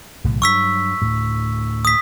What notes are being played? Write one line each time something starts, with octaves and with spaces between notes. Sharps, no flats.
B1 A2 C#3
G2 F#3 C#6 E6 B6
D2 A2
D#6 B6